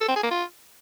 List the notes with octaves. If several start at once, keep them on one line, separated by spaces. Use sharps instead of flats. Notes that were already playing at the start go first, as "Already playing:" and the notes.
A4
C4
G#4
A#3
F4